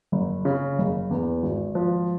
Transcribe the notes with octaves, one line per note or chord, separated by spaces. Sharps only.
F#1
C#3
F#1
E2
G#1
F3